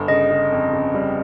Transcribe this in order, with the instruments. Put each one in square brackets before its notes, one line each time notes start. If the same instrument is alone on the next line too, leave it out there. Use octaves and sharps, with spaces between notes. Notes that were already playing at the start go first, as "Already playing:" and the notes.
Already playing: [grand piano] G1
[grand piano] C#3 [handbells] D#5
[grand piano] C#3
F2
C#3
G3